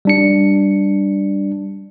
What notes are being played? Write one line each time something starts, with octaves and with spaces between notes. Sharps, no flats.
G3 D4 C#7